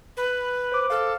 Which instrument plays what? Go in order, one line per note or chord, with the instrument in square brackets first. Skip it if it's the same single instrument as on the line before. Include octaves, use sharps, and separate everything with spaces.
[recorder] B4
[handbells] C5 D6
[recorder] A4 [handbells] F5 F6